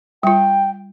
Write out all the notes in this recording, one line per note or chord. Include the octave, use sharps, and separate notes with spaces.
G3 F4 G5